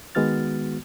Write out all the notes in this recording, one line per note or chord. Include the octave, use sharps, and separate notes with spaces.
D#3 G#3 B3 F#4 F6 A6